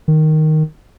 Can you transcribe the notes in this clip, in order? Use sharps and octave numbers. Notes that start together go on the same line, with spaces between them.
D#3